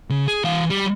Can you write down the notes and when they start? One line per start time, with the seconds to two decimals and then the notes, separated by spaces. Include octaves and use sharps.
0.10 C#3
0.28 G#4
0.44 E3 F5
0.70 G3